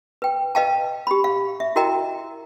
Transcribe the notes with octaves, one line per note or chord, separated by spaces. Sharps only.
B4 G5
B4 D#5 F5 G5 A5
G4 B5
F5
E5
E4 F#4 A#4 D#5 G5 A#5